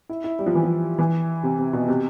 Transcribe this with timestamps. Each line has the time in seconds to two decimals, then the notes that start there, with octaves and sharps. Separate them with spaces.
0.09 E4
0.24 E4
0.39 G3
0.46 F3
0.55 E3
0.63 F3
0.99 E3
1.43 C3
1.59 C3
1.73 B2
1.88 C3